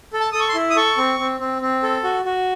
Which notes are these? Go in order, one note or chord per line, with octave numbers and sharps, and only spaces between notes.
A4
A5
A4 D#6
C#6
C6
E4
D#6
A4 C#6
C4
C4
C4
C4
A4
F#4
F#4